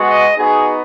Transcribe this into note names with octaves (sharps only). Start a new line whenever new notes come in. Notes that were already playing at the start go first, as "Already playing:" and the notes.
Already playing: G#3 B3 F#4
D#5
B3 D#4 F#4 G#4